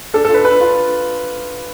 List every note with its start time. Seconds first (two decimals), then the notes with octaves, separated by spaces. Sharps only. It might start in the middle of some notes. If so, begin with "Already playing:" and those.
0.14 D4 A4
0.25 A4
0.29 F4
0.34 B4
0.44 D4 B4
0.61 F4